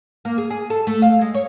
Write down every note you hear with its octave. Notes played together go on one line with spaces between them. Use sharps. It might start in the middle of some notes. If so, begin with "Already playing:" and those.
A#3
G#4
G#4
A4
A3
F5
G#3
C#5